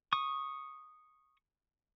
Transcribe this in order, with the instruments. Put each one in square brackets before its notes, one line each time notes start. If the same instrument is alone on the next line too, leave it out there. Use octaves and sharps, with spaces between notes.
[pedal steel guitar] C#6 D#6